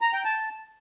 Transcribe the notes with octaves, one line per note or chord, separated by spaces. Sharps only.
A#5
G5
A5